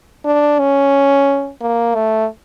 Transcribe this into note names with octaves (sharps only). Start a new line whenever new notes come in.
D4
C#4
A#3
A3